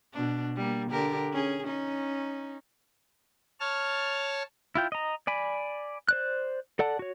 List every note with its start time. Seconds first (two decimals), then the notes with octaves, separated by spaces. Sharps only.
0.13 B2 D4
0.56 G3 A#3
0.91 D3 G4 A#4
1.32 C#4 G#4
1.65 C#4 D#4
3.60 C#5 A5 F6
4.75 E4 F4 G5
4.92 D#5 A#5
5.27 D5 G#5 B5
6.09 C5 D5 F#6
6.79 A4 D5 F#5 A5
6.99 F#4 C#5